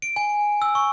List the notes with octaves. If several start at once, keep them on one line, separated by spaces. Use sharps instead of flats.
D7
G#5
E6
C#6